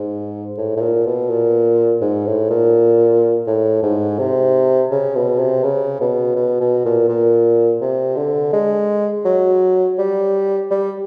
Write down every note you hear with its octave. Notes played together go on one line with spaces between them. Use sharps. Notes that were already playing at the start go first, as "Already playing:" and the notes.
Already playing: G#2
A2
A2
A#2
B2
A#2
G#2
A2
A#2
A2
G#2
C3
C#3
B2
C3
C#3
B2
B2
B2
A#2
A#2
C3
D3
G#3
F#3
G3
G3